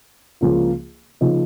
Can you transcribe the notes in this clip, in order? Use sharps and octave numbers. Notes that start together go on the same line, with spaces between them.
C#2 C#3 F3 A#3 F4
C#3 F3 A#3 D#4